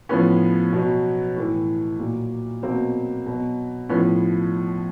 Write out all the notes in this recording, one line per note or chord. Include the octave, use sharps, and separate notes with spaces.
A2 F3 B3 C#4
B2 F#3
A2 E3
A#2 F#3
B2 F#3 A#3 C4
B2 F#3
A2 F3 B3 C#4